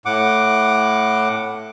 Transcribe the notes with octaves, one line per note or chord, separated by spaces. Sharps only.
A2 F#5 D6